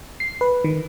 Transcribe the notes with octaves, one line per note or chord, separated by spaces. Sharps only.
C7
B4
D#3